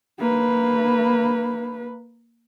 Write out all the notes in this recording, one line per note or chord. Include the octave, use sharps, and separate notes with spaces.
A#3 B4